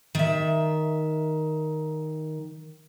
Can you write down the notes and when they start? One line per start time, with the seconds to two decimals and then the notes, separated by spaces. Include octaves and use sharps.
0.15 D#3 E5